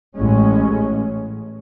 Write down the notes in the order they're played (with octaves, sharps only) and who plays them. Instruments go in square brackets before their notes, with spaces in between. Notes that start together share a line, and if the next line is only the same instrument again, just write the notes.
[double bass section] A1 A2 G#3 C#4